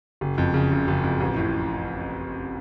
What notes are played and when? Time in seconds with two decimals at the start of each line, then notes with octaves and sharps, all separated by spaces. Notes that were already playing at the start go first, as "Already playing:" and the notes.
0.21 F#1
0.38 F2
0.54 C#3
0.71 F#1
0.88 F#1
1.04 F2
1.20 A1
1.37 A2